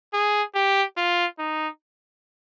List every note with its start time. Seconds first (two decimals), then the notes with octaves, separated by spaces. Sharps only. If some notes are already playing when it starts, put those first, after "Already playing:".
0.13 G#4
0.55 G4
0.97 F4
1.39 D#4